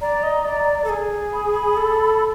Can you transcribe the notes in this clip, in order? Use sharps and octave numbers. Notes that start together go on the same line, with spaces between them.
D5 A#5
D#5
D5
A4
G#4
B5
A4